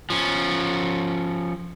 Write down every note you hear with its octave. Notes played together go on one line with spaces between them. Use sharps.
F3 C#4